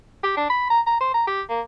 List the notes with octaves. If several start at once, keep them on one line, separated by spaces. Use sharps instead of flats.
G4
D4
B5
A#5
A#5
C5
A#5
G4
A#3